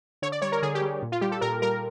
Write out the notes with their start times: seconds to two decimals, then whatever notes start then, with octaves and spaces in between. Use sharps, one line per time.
0.22 D3 C#5
0.32 D5
0.42 G3 C#5
0.52 A#4
0.62 D3 G#4
0.75 G4
0.82 G3
1.02 A#2
1.12 F4
1.21 G3 G4
1.32 A4
1.41 A#2 A#4
1.62 G3 A#4